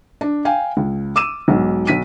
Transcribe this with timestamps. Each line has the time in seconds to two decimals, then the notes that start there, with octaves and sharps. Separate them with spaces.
0.21 D4
0.45 F5 G5 G#5
0.77 C#2
1.16 D6 E6 D#7 E7
1.48 B1 G#2 B2
1.87 B1 B6 D#7